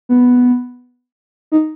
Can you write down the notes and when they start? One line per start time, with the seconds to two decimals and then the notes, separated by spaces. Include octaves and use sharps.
0.09 B3
1.52 D#4